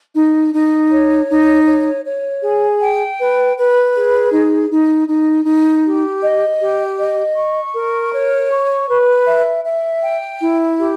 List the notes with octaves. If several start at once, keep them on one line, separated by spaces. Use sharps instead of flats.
D#4
D#4
C#5
D#4
C#5
C#5
G#4
G5
B4
B4
G#4
D#4
D#4
D#4
D#4
G4
D#5
G4
D#5
C#6
A#4
C#5
C#6
B4
E5
E5
G5
E4
G4